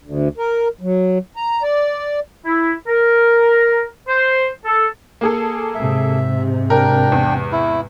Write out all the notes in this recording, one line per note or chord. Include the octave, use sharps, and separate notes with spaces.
D2
A#4
F#3
A#5
D5
E4
A#4
C5
A4
A#3 G#4 A4
G#2 C3 E5
D4 A#4 G5
E2
E4